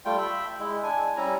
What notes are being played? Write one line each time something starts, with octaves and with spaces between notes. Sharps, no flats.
G3 A3 F4 G5
E5 G5 B5
G#3 E4
D4 G#5
G3 C#4 E4 A#5